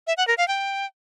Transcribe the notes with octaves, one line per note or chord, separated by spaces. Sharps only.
E5
F#5
A#4
F5
G5